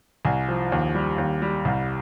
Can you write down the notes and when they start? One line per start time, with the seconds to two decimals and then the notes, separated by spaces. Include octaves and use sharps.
0.25 C2 G#5
0.49 F3
0.72 D#2
0.95 G3
1.18 D#2
1.42 G3
1.65 C2